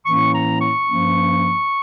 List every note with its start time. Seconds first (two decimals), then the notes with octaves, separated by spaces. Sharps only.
0.06 A2 E3 A#3 C#4 C#6
0.32 A#5
0.60 C#6
0.87 G2 F3 A#3 C#4